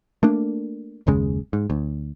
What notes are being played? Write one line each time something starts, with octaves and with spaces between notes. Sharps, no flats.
A3 A#3 D4
F#1 D#2 C#3 G#3
G#2
D2